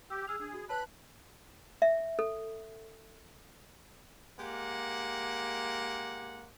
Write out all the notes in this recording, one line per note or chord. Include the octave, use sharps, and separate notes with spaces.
G4 E6
G#4 E6 F6 F7
D4 G#4
F#4
B4 C#5 A5 B5 F#6
E5
A4
G#3 A#3 G4 F#5